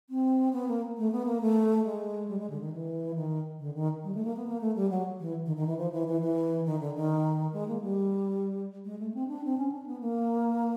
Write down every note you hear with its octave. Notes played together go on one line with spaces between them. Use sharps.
C4
B3
A#3
A3
B3
A#3
A3
G#3
G3
G#3
D3
D#3
E3
D#3
D3
D#3
G3
A3
A#3
B3
A#3
A3
G3
F#3
E3
D#3
D#3
E3
F3
E3
E3
E3
D#3
D3
D#3
G#3
A#3
G3
G#3
A3
C4
D4
C4
C#4
D4
B3
A#3